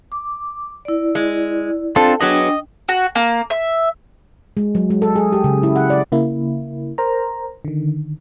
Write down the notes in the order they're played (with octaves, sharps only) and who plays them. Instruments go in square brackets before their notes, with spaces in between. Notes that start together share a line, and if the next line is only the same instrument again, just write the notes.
[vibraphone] D6
E4 D5
[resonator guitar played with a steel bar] G#3
[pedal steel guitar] C4 D4 F4 [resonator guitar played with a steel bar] A4
[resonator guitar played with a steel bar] F#3 B3 G#4 [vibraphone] D4 G5 [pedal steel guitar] D#5
[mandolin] F#4
A#3
E5
[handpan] G#3
F#3
G#3
A4
G#4
G4
C#3
E4
F#5
D5
[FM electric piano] C#3 A#3 E4
A#4 C5 A#5
D3 D#3